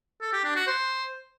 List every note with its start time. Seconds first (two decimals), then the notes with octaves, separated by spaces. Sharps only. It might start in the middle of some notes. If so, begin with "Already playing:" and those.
0.21 A4
0.33 G4
0.44 D4
0.55 F#4
0.67 C5